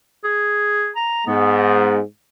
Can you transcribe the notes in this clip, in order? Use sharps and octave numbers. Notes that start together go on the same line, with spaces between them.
G#4
A#5
G#2 G#3 B3